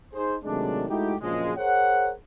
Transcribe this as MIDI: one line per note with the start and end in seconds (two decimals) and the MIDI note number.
0.13 0.35 63
0.13 0.35 68
0.13 0.35 72
0.44 0.84 48
0.44 0.84 51
0.44 0.84 54
0.44 0.84 56
0.44 0.84 57
0.44 0.84 62
0.89 1.14 56
0.89 1.14 57
0.89 1.14 63
0.89 1.14 64
0.89 1.14 66
0.89 1.14 67
1.20 1.52 34
1.20 1.52 42
1.20 1.52 46
1.20 1.52 49
1.20 1.52 53
1.20 1.52 56
1.57 2.11 68
1.57 2.11 70
1.57 2.11 72
1.57 2.11 73
1.57 2.11 78